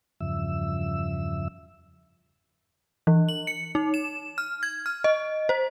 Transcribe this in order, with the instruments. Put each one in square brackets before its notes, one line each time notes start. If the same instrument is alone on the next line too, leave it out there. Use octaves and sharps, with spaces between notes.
[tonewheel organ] E2 G2 C#3 F3 E5 E6
[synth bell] E3
F#7
C#7
D#4
E7
F6
G#6
F6
D#5
C5